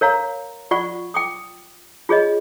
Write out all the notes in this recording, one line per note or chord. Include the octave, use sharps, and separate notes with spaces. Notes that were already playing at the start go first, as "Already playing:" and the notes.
A#4 C#5 F5 A#5
F4 D5 F#5 C#6
G5 D6 D#6
F4 G#4 C#5 D#5